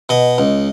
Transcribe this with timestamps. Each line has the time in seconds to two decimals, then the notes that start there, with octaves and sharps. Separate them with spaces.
0.09 B2 D#5
0.38 C#2